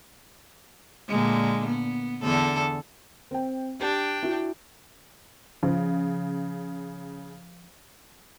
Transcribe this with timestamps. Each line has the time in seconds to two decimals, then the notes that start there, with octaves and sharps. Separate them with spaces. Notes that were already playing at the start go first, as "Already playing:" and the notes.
1.08 A#2 D3 G#3
1.66 B3
2.23 E2 D3 A4
3.31 C4 G5
3.80 D4 G4 G5
4.23 E4 F#4
5.63 C#3 F3